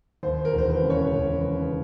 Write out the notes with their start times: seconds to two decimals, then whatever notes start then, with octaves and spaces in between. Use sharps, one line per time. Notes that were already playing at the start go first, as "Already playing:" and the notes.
0.23 D#2 C5
0.45 A#4
0.53 E1
0.58 C5
0.69 B4
0.83 C#3
0.90 C#5
1.14 E1
1.44 C#3